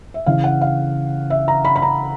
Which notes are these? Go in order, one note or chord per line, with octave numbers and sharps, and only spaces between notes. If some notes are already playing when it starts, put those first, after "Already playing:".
E5
C#3 E3 F5
F#5
F5
E5
A#5
B5
B5
A#5